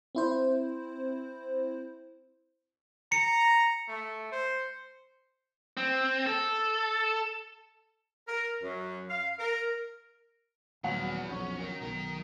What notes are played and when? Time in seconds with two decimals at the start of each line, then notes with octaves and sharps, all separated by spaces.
0.15 C4 E4 C5
3.12 A#5 C#7
3.88 A3
4.32 C5
5.77 C4
6.26 A4
8.28 A#4
8.63 F#2
9.10 F5
9.40 A#4
10.84 D#1 E2 F#3 F#5 F7
11.30 B1 F2 C#4
11.60 A#4 D#5
11.82 B1 D#3 A#5